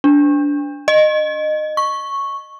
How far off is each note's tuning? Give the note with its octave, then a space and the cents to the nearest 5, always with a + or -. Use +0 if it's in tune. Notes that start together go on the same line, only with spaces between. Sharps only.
D4 -20
D#5 -20
C#6 -5